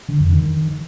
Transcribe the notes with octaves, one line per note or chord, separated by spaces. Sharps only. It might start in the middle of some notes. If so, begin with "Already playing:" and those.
D3
F2
D#3